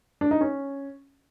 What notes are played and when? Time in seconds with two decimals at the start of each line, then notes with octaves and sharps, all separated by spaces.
0.21 D4
0.31 D#4
0.41 C#4